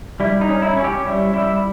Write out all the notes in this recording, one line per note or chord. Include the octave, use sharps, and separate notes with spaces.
G3 E4
D#4
C#4
E4
C#4
G4
G3 E4
G3 E4